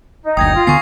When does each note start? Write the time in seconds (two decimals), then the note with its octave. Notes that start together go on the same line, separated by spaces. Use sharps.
0.22 D#4
0.37 F#1 D2 G5 D#6 G#6 A#6
0.54 F4
0.67 D2 D3 B3 G#5 C#6 D#6 C7